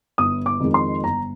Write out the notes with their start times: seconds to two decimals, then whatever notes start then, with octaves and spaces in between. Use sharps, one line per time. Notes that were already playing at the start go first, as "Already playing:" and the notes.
0.18 G1 D#6
0.46 D6
0.60 F2 D#3 G#3
0.74 C6
1.03 G1 A#5